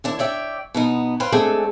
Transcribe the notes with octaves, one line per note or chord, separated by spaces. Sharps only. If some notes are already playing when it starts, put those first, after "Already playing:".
D#2 D4 E4
C#5 D5 E5 G5
B2 B3 D#4
B4 C5 F5 G5
G#3 A3 C4 D4 G#4 A4